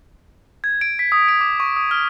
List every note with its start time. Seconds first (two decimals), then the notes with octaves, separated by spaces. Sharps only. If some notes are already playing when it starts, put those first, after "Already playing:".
0.64 G#6
0.81 D7
0.99 B6
1.12 D#6
1.28 D7
1.41 D6
1.60 C#6
1.77 D#6
1.91 F6